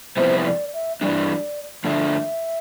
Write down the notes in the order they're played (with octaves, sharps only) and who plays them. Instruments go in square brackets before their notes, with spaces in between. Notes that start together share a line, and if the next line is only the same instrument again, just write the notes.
[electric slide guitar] F2 C3 G3 B3 E4 [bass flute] C5
[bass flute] D5
E5
[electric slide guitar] G2 E3 G3 D4 [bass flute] D5
[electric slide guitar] G2 D3 F3 A3 D4 [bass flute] E5